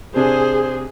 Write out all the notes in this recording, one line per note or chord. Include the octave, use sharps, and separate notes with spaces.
C3 D4 G#4 C5